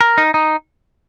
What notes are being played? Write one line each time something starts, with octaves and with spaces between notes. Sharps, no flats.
A#4
D#4
D#4